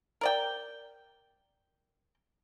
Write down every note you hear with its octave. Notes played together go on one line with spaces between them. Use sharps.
A#4 D5 G5